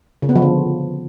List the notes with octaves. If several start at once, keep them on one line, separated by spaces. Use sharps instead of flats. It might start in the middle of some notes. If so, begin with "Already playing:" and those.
C#3
B3
F3
D3